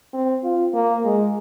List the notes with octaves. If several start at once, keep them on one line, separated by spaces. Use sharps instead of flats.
C4
F4
A#3
G#3